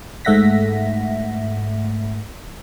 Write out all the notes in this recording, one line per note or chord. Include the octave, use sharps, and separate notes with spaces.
G#2 A3 E5 F#5 A#6 B6